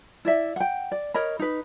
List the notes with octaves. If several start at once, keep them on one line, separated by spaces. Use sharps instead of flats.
E4 D5 E5
F#5 G5
D5
A#4 C#5 D#5 B5
D#4 B4